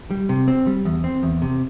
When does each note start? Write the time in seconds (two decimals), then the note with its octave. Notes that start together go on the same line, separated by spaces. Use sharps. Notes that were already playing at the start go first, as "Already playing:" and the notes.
0.11 G3
0.29 C3
0.48 C4
0.67 G3
0.85 E2
1.04 C4
1.23 E2
1.42 C3